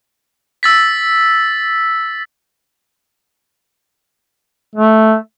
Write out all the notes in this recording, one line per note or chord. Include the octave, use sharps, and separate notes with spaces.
E6 A6 B6
A3